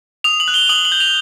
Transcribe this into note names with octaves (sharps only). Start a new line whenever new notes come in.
D#6 F7
F#7
F#6
G7
D#6 F#7
F#7
G6
F7